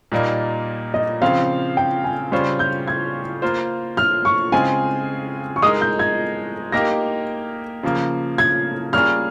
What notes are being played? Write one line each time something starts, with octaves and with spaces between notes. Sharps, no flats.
A#2 G3 A#3 D#4
D#5
C#3 F3 C4 F5
G5
G#5
C#3 G3 C#4 F4 C5 C6
G6
G#6
A#3 F4 C5
F6
C#6
C#3 G#3 C4 F4 G#4 G#5
C#6
G#3 D#4 A#4 D#6
G6
G#6
A#3 D#4 G4 A#4 A#6
C#3 F3 A#3
G#6
G3 A#3 C#4 F4 G#4 F6